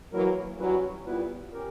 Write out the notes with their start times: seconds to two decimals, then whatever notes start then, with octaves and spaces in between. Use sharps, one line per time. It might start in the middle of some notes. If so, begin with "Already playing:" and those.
0.13 E3 F#3 A#3 E4 A#4
0.59 F#3 G3 C#4 E4 B4
1.06 A#2 G3 B3 E4 B4
1.52 C#4 G4 A#4